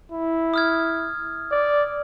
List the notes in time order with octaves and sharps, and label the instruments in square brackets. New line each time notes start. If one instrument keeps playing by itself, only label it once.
[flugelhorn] E4
[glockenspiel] D#6 F6 G#6
[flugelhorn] D5